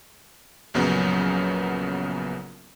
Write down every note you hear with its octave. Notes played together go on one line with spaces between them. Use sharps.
A#1 F#2 C#3 F#3 B3 C#4